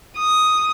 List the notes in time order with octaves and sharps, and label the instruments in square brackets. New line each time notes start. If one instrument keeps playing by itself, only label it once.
[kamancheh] D#6